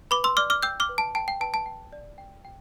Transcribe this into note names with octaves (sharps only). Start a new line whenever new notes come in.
B4 B5 D6
C6 E6
D5 D6 F6
D6 F6
G5 E6 G6
D6 F6
B4
A5
G5 A5
G5
B4 A5
A5
G5
D5
G5
G5